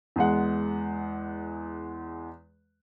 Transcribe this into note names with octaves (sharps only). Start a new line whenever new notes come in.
E2 G#3 F#5